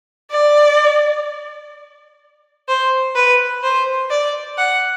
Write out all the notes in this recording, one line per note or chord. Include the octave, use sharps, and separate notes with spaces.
D5
C5
B4
C5
D5
F#5